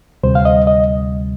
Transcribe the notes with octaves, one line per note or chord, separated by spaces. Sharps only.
D2 C3 G3 C5
F5
D#5
D#5